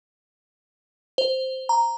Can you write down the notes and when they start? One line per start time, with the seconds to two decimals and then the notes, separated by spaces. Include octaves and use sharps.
1.18 C5
1.69 A#5